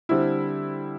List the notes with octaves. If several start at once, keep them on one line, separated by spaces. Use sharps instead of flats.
D3 G3 C4 E4